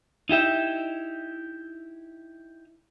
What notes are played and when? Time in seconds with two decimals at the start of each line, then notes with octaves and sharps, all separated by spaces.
0.29 D#4 E4 G4 E5